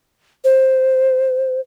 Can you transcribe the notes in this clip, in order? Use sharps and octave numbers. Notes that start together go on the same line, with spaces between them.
C5